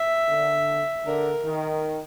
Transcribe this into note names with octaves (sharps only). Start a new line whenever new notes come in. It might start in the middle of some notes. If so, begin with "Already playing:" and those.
Already playing: E5
D3
D3 A#4
D#3